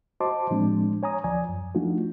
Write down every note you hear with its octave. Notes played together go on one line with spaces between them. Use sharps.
F#4 C5 D#5 A5 C6 D6
A2 F3 G#3 C4 D4
C#5 G#5 A#5 D#6
D2 F3 D5 G#5
F#2
F3 A3 D4 D#4 F4 F#4